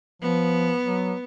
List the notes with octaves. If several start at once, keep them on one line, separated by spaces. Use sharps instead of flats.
F3 B3
F#3